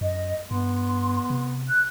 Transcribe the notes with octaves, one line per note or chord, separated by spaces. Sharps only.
F#2 D#5
G2 B3 C6
C3
F#6